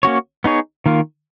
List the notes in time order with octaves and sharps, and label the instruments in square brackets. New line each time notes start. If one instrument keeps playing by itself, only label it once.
[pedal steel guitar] A#3 C#4 F#4 C#5
B3 D#4 G#4 C#5
D#3 A#3 F4